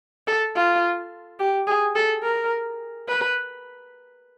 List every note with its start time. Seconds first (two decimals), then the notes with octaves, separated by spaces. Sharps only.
0.27 A4
0.55 F4
1.39 G4
1.67 G#4
1.95 A4
2.23 A#4
3.08 B4